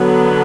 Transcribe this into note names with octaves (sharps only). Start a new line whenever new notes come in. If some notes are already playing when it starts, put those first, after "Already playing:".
Already playing: D3 F#3 B3